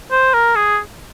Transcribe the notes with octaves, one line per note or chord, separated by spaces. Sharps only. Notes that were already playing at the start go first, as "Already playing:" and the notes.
C5
A#4
G#4